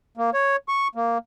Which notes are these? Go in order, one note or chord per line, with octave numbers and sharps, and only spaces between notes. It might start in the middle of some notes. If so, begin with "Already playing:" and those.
A#3
C#5
C#6
A#3